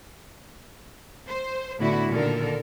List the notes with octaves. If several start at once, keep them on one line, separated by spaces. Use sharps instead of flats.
C5
A2 D3 B3 E4 F#4
A#2 D3 D#3 A4 A#4